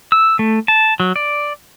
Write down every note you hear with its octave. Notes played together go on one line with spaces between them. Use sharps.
E6
A3
A5
F#3
D5